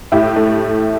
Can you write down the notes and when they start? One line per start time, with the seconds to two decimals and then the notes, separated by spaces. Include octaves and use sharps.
0.12 A2 E4 G4
0.36 A3